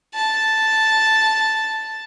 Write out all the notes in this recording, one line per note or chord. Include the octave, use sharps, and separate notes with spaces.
A5